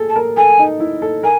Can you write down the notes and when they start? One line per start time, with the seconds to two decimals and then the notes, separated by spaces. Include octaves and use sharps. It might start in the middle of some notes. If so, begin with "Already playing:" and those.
Already playing: G#4 A4
0.09 A5
0.16 A#4
0.37 A4 G#5
0.59 D#4
0.80 E4
1.02 A4
1.23 A#4 G#5